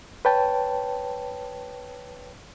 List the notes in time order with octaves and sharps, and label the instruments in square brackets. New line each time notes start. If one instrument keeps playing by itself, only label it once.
[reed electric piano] B4 C#5 G5 A5